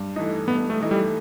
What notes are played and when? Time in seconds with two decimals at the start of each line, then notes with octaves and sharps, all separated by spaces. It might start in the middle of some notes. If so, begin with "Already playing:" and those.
Already playing: G2
0.16 E3 A3 D#4
0.48 G2 B3
0.70 A3
0.81 E3 A3 D#4
0.91 G3